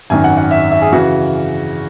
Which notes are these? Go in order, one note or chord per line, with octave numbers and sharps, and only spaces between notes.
G#1 F#2 D#3 G#5
F#5
F#5
E5
E5
G#4
C#3 E3 F#4